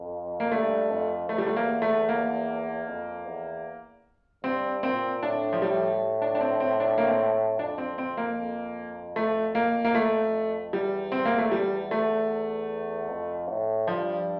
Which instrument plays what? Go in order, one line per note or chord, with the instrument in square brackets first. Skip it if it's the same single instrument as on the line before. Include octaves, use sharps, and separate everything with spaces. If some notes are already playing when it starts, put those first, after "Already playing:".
Already playing: [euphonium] F2
[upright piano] A#3
[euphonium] G2 [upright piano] A3
[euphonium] F2
[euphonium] E2 [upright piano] A3
[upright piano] G3
A3
A#3
A3
A#3
[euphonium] F2
E2
[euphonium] G2 [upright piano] C4
[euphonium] A#2 [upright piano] C4
[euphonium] A2 [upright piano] D4
[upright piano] F3
[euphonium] A2 [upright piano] G3
[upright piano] D4
D4
C4
C4
D4
A#3
C4
[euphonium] F2 [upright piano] D4
[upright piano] C4
C4
A#3
[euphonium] F2
[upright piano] A3
A#3
A#3
A3
[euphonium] E2 [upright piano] G3
[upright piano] C4
A#3
A3
G3
A3
[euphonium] F2
A2
[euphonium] G2 [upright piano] F3